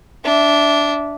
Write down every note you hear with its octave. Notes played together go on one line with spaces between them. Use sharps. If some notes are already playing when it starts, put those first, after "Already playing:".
D4 E5